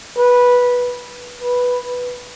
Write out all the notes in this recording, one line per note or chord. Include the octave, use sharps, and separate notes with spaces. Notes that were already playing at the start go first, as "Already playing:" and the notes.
B4
B4